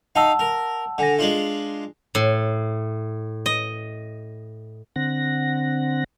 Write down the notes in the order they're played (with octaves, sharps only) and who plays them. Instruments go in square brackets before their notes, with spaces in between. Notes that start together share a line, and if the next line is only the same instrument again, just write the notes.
[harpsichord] D#4 F5 [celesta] F#5 A5 E6
[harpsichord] A#4
[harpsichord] D3 [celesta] F#5 G#5 A#6
[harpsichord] G#3 D4 F4 [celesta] F7 F#7
[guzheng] A2
D#5
[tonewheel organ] D3 C4 F#5 A#6